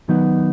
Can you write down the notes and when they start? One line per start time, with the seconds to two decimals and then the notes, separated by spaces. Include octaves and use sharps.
0.09 D#3 F#3 B3 D#4 F#4